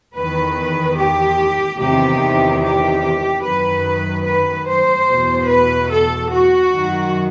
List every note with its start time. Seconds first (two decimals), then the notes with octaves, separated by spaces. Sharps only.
0.16 E2 D#3 B4
0.97 G4
1.80 E2 C3 D#3 G4
2.63 G4
3.44 F#2 D#3 B4
4.27 B4
4.68 C5
5.09 E2 B2
5.49 B4
5.90 A4
6.32 F#4
6.72 F#2 D#3